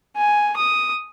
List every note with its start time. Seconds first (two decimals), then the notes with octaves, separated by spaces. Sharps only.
0.16 G#5
0.56 D#6